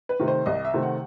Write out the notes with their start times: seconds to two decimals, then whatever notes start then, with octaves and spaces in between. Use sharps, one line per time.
0.09 B4
0.19 C3 D#3 A3 C4
0.28 C5
0.46 C2 D#5
0.65 E5
0.74 C3 D#3 A3 C4
0.83 F#5